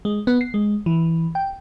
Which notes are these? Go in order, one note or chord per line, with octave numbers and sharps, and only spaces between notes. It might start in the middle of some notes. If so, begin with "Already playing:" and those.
G#3
B3
C7
G#3
E3
G5